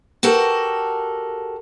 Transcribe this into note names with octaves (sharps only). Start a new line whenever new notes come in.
F#4 G4 A4 A#4 F#5